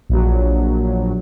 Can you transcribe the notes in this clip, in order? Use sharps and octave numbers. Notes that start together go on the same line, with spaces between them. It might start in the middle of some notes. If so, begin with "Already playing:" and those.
A#1 F#3